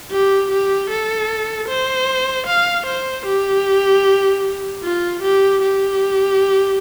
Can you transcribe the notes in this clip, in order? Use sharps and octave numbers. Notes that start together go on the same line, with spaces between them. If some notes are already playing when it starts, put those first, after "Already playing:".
G4
G4
A4
C5
F5
C5
G4
F4
G4
G4